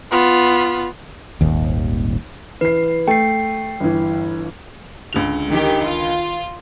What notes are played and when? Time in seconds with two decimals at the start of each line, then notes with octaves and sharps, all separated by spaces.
0.11 B3 F4
1.41 D#1 G#1 D#2
2.61 E3 B4 C7
3.08 A3 G5 C7
3.80 G1 E3
5.13 C#2 D3 F7
5.51 D#3 G4
5.85 F4